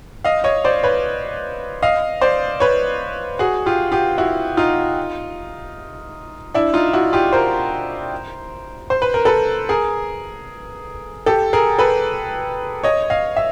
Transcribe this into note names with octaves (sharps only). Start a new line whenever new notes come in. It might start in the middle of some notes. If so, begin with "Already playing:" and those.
D#5 F5
C#5 D#5
C5 D5
B4 C#5
D#5 F5
C5 D5
B4 C#5
F#4 G#4
F4 G4
F4 G4
E4 F#4
D#4 F4
D4 E4
D#4 F4
E4 F#4
F4 G4
A#4 C5
C5
B4
A#4
A4 B4
G#4 A#4
G4 A4
G#4 A#4
A4 B4
C#5 D#5
D#5 F5
E5